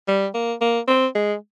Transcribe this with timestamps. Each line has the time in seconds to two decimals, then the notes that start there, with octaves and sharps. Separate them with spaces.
0.08 G3
0.34 A#3
0.61 A#3
0.88 C4
1.15 G#3